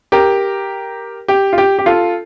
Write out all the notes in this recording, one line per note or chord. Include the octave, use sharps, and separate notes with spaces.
G4 A#4
G4
F4
G4
G4
F4 A4